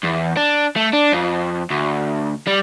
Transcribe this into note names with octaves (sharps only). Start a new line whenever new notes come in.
E2
D4
A3
D4
F2
D2
G3